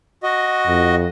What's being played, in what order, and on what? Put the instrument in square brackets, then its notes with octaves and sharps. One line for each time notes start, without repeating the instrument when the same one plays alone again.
[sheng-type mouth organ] F#4 D#5
[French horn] F2